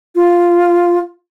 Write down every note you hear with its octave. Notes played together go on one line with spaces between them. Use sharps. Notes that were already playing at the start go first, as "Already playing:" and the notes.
F4